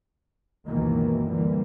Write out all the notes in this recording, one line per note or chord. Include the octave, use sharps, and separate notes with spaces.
C#2 F#2 B2 D#3 E3 A#3
D3 E3 G3 A#3